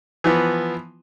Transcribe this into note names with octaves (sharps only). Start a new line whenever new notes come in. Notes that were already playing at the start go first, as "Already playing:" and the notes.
E3 F3 B3